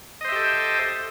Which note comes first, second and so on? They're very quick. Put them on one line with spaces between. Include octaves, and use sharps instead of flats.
D#5 C5 E5 G4 A4